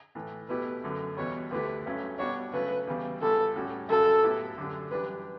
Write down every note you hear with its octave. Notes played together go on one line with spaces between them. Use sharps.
A2 E3 A3
B2 A3 E4 G4 B4
F#2 D3 A3
E2 B2 G3 B3 C#5
D2 D3 A3 E4 G4 B4
G2 F#3 A3 C#4
B2 G3 D4 F#4 C#5
C#3 F#3 A3 B4
E2 C#3 G3
C#2 C#3 G3 B3 A4
A2 G3 C#4 F#4
F#2 C#3 F#3 A4
A2 F#3 B3 E4 G4
F#2 D3 A3 D4 G4
F#2 E3 G3 D4 G4 B4